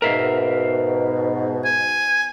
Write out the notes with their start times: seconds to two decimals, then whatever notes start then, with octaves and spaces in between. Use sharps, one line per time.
0.02 G#2 B2 A#4 E5 F5
1.65 G#5